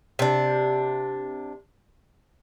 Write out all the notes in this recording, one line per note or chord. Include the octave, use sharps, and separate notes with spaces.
C3 D4